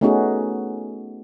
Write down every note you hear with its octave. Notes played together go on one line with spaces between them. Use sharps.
A3 B3 C#4 D#4 F#4 G#4